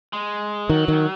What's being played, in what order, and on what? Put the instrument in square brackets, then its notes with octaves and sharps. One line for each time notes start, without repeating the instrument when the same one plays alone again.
[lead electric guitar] G#3
[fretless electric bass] D#3 [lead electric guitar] F#3
[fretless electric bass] D#3